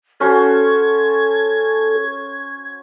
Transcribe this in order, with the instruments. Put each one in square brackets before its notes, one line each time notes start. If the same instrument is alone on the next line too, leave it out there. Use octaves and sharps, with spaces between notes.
[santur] C#4 F#4 C5 [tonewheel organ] A4 [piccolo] G#6